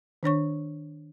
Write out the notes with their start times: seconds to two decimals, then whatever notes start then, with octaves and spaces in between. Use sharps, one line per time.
0.23 D#3 D4 C#5 C#6